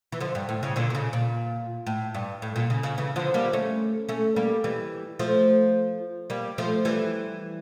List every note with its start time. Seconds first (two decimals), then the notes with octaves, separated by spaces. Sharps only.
0.12 E3
0.21 D3 F3
0.35 G2
0.49 A2
0.63 C#3
0.76 A#2 D3
0.90 A#2
0.95 C#3
1.13 A#2
1.87 A2
2.15 G2
2.42 A2
2.56 A#2
2.70 C#3
2.83 C#3
2.98 C#3 E3
3.16 D3 F3
3.34 G3 A#3
3.53 A3 C#4
4.09 A3 C#4
4.36 G3 A#3
4.64 E3 G3
5.19 F3 A3
6.30 G3 A#3
6.58 F3 A3
6.85 E3 G3